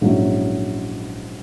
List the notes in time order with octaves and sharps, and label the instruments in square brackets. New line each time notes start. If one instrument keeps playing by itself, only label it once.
[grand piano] A#1 G#2 F#3 C#4 E4